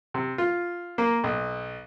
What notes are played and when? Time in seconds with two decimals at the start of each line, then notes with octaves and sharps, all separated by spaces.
0.14 C3
0.38 F4
0.98 A#3
1.24 B1